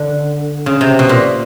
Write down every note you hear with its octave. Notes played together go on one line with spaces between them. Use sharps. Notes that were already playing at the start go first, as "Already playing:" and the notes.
Already playing: D3
C#3
C3
B2
A#2